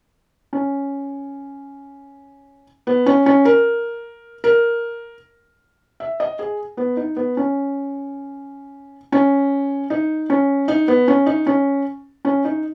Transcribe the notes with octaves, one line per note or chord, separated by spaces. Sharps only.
C#4
B3
C#4
C#4
A#4
A#4
E5
D#5
G#4
B3
D#4
B3
C#4
C#4
D#4
C#4
D#4
B3
C#4
D#4
C#4
C#4
D#4